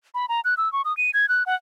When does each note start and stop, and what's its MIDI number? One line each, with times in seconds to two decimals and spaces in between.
0.14 0.26 83
0.29 0.41 82
0.45 0.54 90
0.57 0.71 88
0.73 0.82 85
0.85 0.95 87
0.97 1.11 99
1.14 1.29 92
1.29 1.43 90
1.46 1.55 78